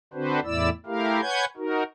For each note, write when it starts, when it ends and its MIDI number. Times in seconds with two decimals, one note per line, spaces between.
0.13 0.40 50
0.13 0.40 60
0.13 0.40 62
0.13 0.40 66
0.13 0.40 71
0.13 0.40 72
0.44 0.70 40
0.44 0.70 45
0.44 0.70 64
0.44 0.70 74
0.44 0.70 88
0.86 1.21 57
0.86 1.21 64
0.86 1.21 67
0.86 1.21 70
0.86 1.21 77
1.21 1.45 71
1.21 1.45 73
1.21 1.45 78
1.21 1.45 80
1.21 1.45 91
1.21 1.45 92
1.57 1.83 63
1.57 1.83 66
1.57 1.83 70